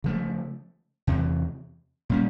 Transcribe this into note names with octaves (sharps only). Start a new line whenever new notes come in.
C#3 F3 A3
E2 C3 E3
A#2 G3 A#3 C#4